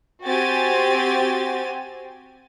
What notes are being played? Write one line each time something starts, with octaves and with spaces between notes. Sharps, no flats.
C4 F#4 G4 G#5 A6